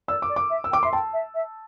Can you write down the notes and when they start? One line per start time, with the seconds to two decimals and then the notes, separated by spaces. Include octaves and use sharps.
0.08 D5 E6
0.22 D6
0.29 D5
0.36 D6
0.50 E5
0.64 E6
0.71 G5 D6
0.83 E5 C6
0.92 G5 A5
1.13 E5
1.34 E5